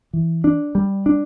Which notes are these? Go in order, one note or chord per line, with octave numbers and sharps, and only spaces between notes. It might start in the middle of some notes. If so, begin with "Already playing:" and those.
E3
D4
G3
D4